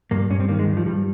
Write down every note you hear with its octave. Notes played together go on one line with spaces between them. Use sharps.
G2 A#3
G2 C#4
C4
D#3 A#3
G#3
G2
F3
G2 G3